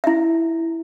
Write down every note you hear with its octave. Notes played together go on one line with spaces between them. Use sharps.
E4 E5